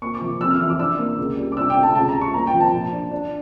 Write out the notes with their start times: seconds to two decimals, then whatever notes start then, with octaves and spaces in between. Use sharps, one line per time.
0.02 A#3 C#6
0.14 D6
0.21 F3
0.41 F2 E6
0.50 F6
0.60 E3 E6
0.70 D6
0.79 D4 E6
0.99 A#3
1.18 C#2
1.37 G3
1.52 D6
1.57 D4 E6
1.70 G5
1.76 A3
1.83 A5
1.95 C#2 A5
2.09 A#5
2.15 G3
2.21 C#6
2.34 A#3 A#5
2.47 G5
2.54 F3
2.60 A5
2.73 A#2
2.92 D4
3.11 D4